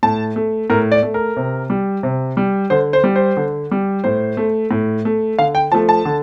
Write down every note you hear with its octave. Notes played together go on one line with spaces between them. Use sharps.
A2 A5
A3
A2 A#4
D5
A3
A#4
C3
G3
C3
G3
D3 C5
C5
G3
C5
D3
G3
A2 C5
A3
A2
A3
D3 F5
G5
F3 A3 A5
A5
D3